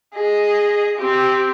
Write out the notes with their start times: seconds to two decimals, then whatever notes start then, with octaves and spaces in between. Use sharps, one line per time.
0.14 G#4 D#5
0.97 C4 G4